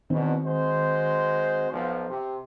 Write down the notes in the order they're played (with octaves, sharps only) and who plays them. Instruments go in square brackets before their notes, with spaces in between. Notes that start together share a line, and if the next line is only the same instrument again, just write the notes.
[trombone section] E2 B2 [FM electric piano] D#3 C4
[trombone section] G#3 F#4 C5
B1 F3
C3